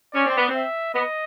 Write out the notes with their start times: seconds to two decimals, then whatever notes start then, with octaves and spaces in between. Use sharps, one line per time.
0.13 C#4 D5
0.26 C4
0.37 B3
0.49 C4
0.55 E5
0.94 B3 D#5